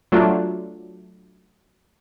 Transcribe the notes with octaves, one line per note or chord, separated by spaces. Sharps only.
F#3 A3 D4 F4